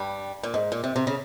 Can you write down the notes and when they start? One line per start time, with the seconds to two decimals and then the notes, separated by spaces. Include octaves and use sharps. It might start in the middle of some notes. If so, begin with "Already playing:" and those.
Already playing: G2 G3
0.43 A#2
0.54 G#2
0.72 A#2
0.84 C3
0.96 C3
1.07 C#3